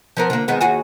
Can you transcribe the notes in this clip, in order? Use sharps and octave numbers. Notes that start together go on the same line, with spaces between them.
F3 B3 A#4
D3 A#3
D#3 G#3 B3
D#2 F#4 G#4